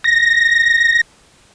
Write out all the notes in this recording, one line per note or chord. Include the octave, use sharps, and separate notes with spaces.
A#6